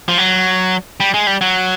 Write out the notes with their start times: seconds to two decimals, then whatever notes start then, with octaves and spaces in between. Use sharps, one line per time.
0.08 F3
0.18 F#3
1.00 G3
1.14 G#3
1.27 G3
1.41 F#3